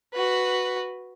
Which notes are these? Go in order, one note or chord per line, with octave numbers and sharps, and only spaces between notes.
F#4 B4